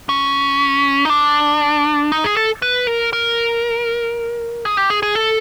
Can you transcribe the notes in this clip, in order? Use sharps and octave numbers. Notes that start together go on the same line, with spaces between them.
C#4
D#4
D4
D#4
G#4
A4
B4
A#4
A#4
G#4
G4
G#4
G#4
A4